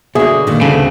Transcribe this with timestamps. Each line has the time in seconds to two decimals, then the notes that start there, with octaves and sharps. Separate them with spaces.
0.15 B2 D3 G#4 E5
0.47 A#2 D#3
0.61 D2 C#3 A3